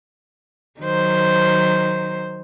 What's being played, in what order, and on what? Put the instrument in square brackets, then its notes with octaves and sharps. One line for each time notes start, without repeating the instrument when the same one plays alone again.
[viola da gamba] D#3 F#3 C5